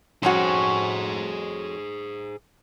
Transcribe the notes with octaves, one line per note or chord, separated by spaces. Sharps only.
F2 C#4 F#4 G#4 C5